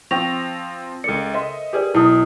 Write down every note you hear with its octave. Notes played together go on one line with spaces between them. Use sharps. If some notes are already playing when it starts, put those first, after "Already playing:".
F3 C4 C5 G5 C#6 A#6 F7
C#2 A4 A#4 D5 C#7
C5 D#5 E5 C6
G4 G#4 A#4 B4 D5
B1 E4 A5 D#6